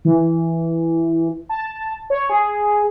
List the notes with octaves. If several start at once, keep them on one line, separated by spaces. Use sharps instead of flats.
E3
A5
C#5
G#4